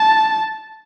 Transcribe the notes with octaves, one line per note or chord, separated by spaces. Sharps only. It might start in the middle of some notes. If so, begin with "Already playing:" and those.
Already playing: A5